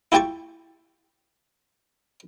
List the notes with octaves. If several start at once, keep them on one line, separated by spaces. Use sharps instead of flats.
E4 F4 G4 G5 A5 C#6